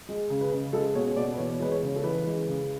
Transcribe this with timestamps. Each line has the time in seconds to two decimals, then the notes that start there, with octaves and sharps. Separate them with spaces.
0.09 G#3
0.30 C#3
0.41 B4
0.52 C#3
0.73 G#3 A4
0.95 B2 C#5
1.16 B2 D5
1.34 B4
1.38 E3 C#5
1.60 G#3 B4
1.72 C#5
1.83 C#3
1.96 A4
2.04 E3 B4
2.26 G#3
2.47 C#3